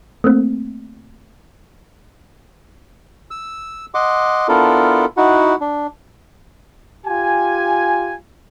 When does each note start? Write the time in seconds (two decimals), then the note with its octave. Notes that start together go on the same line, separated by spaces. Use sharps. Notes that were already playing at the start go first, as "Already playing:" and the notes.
0.24 A3 A#3 C4
3.31 E6
3.94 D#5 F#5 C6 D6
4.48 B3 D4 E4 F4 A4 A#4
5.17 D#4 E4 F#4 F#5
5.61 D4
7.06 F4 G4 G#5